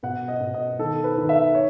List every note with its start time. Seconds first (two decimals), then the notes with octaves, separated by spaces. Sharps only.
0.03 B2 F#5
0.28 D#5
0.41 B2
0.54 D#5
0.79 D#3 A4
1.04 B4
1.17 D#3
1.29 E5
1.55 C#5